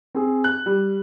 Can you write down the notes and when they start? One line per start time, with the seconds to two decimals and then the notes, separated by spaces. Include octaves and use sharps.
0.15 C4 G#4
0.44 F#6
0.66 G3